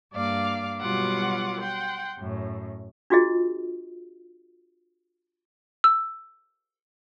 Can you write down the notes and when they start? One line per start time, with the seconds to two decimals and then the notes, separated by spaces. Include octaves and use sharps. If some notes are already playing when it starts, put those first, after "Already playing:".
0.12 G2 A#3 D5 F5 D6
0.79 B2 F#3 G3 F4 F#5 D6
1.60 F#5 G5 C6
2.17 F#2 A2
3.10 D4 F4 F#4 G#4 D#5
5.84 E6